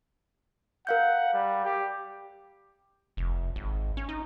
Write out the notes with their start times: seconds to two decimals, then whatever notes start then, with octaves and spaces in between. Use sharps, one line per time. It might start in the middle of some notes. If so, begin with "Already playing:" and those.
0.87 A#4 F5 F#5 G6
1.34 G3
1.65 G4
3.17 F1
3.56 G#1
3.97 C#4
4.09 D#4